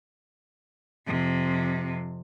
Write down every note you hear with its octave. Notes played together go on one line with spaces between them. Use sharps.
F2 C3